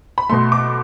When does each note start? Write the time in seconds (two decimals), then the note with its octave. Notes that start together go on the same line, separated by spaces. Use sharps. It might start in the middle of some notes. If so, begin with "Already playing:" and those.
0.18 B5
0.29 B2 A3 C6
0.52 D6